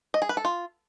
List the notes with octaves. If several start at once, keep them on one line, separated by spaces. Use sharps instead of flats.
D#5
G#4
B4
A4
F4